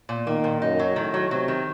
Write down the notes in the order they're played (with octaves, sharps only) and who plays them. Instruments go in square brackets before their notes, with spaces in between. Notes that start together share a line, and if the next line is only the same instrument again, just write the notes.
[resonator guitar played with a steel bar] A#2
[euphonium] D#3 [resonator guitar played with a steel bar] A#3
[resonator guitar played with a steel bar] A#2
[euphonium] F#2 [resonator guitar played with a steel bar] D#4
[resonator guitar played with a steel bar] F#3
[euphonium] A2 [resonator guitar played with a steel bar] D#3
[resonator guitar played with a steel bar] F#3
[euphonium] C3 [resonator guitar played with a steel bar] F#3
[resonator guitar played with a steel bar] D#3